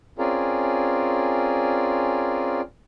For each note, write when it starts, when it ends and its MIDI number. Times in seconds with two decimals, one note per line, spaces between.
0.18 2.61 60
0.18 2.61 61
0.18 2.61 65
0.18 2.61 68
0.18 2.61 70
0.18 2.61 74